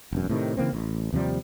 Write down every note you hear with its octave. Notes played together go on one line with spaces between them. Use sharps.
E1 F#2
A2 C3 D#3
C#3 E3 A#3 C4
A1
D#2 C3 F3 G3